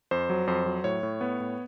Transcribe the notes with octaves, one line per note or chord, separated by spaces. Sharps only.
F2 C5
F#3
F2 C5
F#3
A2 C#5
A2
B3
A2